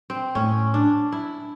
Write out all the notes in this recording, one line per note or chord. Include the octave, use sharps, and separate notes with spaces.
C4
A2 C#4
D4
E4